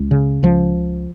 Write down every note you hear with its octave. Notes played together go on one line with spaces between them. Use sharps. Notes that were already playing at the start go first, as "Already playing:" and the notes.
Already playing: C#2
C#3
C#2 F3